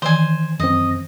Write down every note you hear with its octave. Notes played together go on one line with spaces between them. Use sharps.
D#3 E3 C5 G#5
F#2 C4 D#5